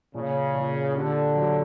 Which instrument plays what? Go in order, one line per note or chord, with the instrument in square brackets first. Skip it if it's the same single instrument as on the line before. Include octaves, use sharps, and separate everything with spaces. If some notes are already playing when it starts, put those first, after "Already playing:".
[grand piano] A#2 [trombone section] C#3
[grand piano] A#2
[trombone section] D3 [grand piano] G4
[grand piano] F#3